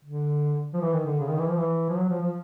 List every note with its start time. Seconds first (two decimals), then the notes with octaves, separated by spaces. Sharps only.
0.04 D3
0.74 F3
0.81 E3
0.93 D#3
1.06 D3
1.20 C#3
1.29 D#3
1.39 E3
1.49 F3
1.57 E3
1.89 F3
1.96 F#3
2.09 F3
2.22 F3